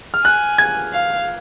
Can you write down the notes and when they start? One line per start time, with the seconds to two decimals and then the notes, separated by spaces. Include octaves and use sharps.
0.14 F6
0.25 G#5 F#6
0.58 G#6
0.93 F5